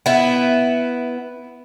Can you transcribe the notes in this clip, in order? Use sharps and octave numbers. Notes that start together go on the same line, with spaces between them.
B3 E4